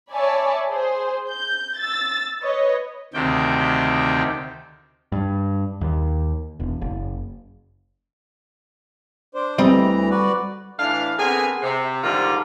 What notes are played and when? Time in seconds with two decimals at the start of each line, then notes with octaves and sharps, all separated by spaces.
0.11 C#5 D5 E5 G#5 A5 B5
0.69 G#4 C5
1.30 G6
1.79 E6 A6
2.43 B4 C#5 D#5
3.14 D2 C3 D#3 G5
5.12 G2
5.81 D#2
6.60 E1
6.81 F#1
9.35 D4 C5
9.58 D2 E3 G3 C4 D#5 A#5
10.10 F#4 B4 D5
10.79 A2 E3 D4 F5
11.18 D3 B3 C4 G#4 A#4 G#5
11.62 C3
12.03 G#2 D3 D#3 G3 A#3 F4